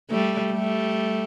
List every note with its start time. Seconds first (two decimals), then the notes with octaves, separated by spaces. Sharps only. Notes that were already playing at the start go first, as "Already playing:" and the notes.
0.10 G3 A3
0.52 G3 A3